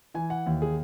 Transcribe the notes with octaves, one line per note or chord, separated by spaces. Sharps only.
E3 G#5
F#5
D#2
G#4